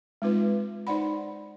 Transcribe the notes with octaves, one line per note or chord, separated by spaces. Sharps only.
G#3 C4 D#4 F4 B4
D#4 C5 D5 F#5 B5